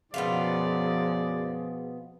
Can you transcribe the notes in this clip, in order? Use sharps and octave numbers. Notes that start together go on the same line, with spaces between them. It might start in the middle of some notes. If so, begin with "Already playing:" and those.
F#2 B2 F3 G#3 B3 F4 G#4 D5